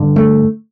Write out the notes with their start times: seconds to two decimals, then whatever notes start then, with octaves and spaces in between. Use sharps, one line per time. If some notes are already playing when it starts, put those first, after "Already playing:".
Already playing: G2 D3
0.16 A3